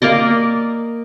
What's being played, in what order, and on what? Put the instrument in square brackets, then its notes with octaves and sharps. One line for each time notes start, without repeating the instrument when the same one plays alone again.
[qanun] A#3 A#4 D5 D#5